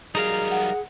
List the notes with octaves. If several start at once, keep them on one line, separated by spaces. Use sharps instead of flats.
F#3 G3 D#4 G#4 A#4 F5
F#5